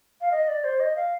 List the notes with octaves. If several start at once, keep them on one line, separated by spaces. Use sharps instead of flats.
F5
D#5
D5
C5
D#5
F5